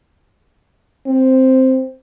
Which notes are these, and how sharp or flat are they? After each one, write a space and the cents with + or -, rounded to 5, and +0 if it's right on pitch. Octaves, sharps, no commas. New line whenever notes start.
C4 +0